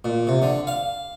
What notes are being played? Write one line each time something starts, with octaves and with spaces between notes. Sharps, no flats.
A#2
C3
D3
F5